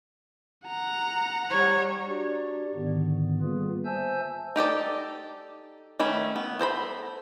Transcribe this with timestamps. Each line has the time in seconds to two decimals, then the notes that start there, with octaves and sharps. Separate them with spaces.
0.66 F#5 A#5
1.50 G3 C#5
2.07 D4 F#4 G4 D5
2.75 G#2 D3 D#3 B3
3.41 G3 A#3 B3 F4 G#4 B4
3.85 C5 E5 G#5 A5 E6 G6
4.56 D#4 G4 A4 D5
5.99 D#3 A3 C#4 B5
6.36 B3
6.59 A4 C5 A#5 B5